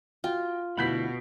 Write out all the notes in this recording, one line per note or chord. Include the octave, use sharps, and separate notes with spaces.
F4 F#4 G5
D2 B2 E4 F#5 B5 G6 B6